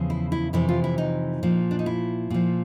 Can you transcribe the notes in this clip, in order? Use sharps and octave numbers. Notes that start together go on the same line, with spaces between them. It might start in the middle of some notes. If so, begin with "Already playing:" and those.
Already playing: E2 C#3 F3
E4
E4
F2 C3 E3 E4
F4
E4
D#4
A#2 F3
D4
D#4
E4
A#2 F3